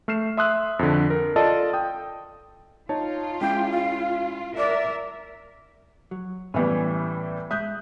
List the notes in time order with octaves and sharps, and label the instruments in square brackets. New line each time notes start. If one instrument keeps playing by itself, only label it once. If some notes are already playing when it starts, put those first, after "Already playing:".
[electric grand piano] A3 F6 C7 E7
E5 C6 D#6 E6 F#6
F2 D3
A#4
F4 A4 D5 D#5 A5
G5 D#6
[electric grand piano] D#4 C#5 A5 [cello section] F4
[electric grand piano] G#3 C#4 E4 [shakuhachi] G5
[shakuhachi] F5
[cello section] A#4 E5 [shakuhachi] D5
[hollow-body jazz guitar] F#3
[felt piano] A2 E3 G3 [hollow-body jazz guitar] B3 C#4
[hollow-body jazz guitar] G#3 E5 [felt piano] D#6 F#6 G6